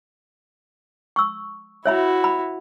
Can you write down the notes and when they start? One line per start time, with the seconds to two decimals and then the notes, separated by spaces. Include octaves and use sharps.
1.16 C#6 E6
1.86 E4 F#4 C#5 E5 B5
2.24 B5